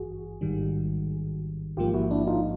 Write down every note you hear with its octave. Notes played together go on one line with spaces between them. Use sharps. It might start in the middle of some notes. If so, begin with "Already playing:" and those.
Already playing: G#1 G2 E3 F#4 G#4
A1 G#2 D#3 G3
A1 G#2 F3 A#3 F4 G4
E4 F#4
D4 E4
D#4 F4